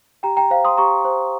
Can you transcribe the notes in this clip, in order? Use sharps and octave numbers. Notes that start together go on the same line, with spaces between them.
G4 G5 A#5
G5 A#5
C5 F5
C6 D#6
G4 A#5 C#6
C5